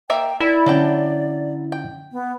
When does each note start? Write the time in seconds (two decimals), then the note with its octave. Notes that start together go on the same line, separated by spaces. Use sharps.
0.10 A#3 A#4 E5 G5
0.40 E4 A#4 D5
0.66 D3 F#3 C#4 A4 G5
1.72 G5
2.12 B3